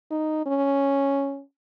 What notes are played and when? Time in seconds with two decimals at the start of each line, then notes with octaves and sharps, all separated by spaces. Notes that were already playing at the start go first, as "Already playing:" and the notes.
0.11 D#4
0.46 C#4